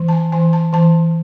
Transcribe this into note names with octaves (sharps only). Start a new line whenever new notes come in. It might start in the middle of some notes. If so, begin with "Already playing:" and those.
Already playing: E3
A5
G#5
E3 G#5
A5
E3 A5